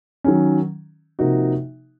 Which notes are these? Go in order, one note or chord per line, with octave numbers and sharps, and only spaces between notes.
D#3 F#3 C#4
C3 F3 A#3 D#4 F#4